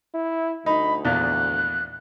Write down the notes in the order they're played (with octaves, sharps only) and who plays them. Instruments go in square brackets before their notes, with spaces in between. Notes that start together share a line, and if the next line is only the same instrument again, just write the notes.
[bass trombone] E4
[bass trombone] D2 [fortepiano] D#4 [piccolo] B5
[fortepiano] A#1 E2 [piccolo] F#6